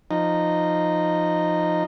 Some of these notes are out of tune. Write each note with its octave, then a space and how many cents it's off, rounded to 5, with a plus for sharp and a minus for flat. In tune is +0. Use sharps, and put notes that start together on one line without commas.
F3 +0 D#4 -10